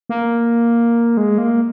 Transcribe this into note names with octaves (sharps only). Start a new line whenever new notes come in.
A#3
G#3
A#3